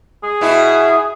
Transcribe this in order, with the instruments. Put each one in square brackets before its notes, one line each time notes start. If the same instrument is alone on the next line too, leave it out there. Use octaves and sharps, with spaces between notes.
[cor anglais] G#4
[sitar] B2 E4